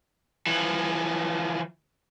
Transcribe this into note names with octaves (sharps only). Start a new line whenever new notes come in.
E3 F3